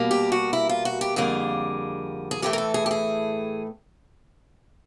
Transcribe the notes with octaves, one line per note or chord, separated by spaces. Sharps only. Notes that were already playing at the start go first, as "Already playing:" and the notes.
Already playing: B2 G3 A#3
G4
F#4
E4
F4
F#4
G4
F2 D3 G3 A#3 G#4
G#4
A2 E3 A3 G4
A#4
A4
G#4
G4
G#4